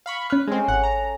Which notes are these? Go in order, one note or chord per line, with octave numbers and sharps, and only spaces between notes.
F5 B5 C#6
C#4 B4 F6
C#3 G#3 C4 A4
G#1 F#5
A#5